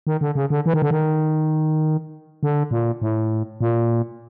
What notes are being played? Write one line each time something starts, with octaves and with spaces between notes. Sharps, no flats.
D#3
D3
C#3
D3
E3
D#3
D3
D#3
D3
A#2
A2
A#2